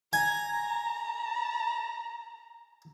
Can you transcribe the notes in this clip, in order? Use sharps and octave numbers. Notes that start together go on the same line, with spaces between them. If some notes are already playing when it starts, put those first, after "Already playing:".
G#5 A#5